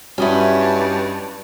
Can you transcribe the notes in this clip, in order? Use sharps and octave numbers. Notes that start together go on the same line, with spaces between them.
G2 F#3 G3 C#4 E4 D#5 G#5